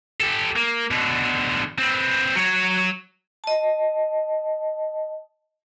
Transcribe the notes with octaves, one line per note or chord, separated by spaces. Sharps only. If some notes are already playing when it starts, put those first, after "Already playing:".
G4 A4
A#3
B2 D3
C4 B4
F#3 C#5
D#5 A5